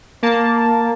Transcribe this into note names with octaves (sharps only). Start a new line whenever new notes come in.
A#3 A5